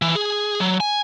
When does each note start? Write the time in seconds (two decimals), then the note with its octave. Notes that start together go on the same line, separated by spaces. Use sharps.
0.02 E3
0.15 G#4
0.60 F#3
0.80 G#5